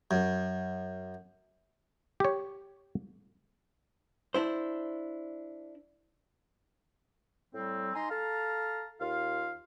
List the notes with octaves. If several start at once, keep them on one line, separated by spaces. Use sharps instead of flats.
F#2
G4 C#5
D4 E4 C5
A2 G3 C4
D#4 G#5 A#5 C6
A4 F5 A5 A#5 F6
D#2 F4 F5